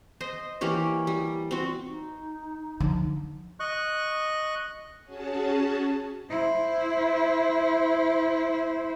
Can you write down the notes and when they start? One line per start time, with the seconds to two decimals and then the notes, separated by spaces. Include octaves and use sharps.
0.21 C5 D#5
0.61 E3 A#3 G4 C#5
1.07 G3
1.51 C4 F#4
1.88 D#4
2.80 D3 F3
3.60 D#5 C#6 F#6
5.04 C#4 F#4 G#4 A5
6.30 E4 C5